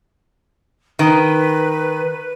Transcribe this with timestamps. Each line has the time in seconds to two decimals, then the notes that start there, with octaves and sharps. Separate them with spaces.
0.99 D#3 B4